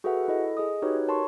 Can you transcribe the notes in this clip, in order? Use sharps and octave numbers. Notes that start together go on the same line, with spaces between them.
F#4 G#4 A4 B4 E5 F#5
E4 A4 D#5
G#4 D#5 D#6
D#4 F#4 G4 B4 C#5
A#4 C#5 A5 C6 C#6